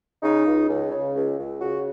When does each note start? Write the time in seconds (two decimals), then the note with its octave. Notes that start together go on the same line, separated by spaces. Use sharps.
0.22 C#3 D#4
0.45 C#2
0.68 C#2
0.91 C#3
1.15 C#2
1.37 C#2
1.60 C#3 F#4